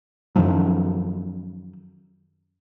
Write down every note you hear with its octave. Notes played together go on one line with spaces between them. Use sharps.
F#2 D#3 F3 F#3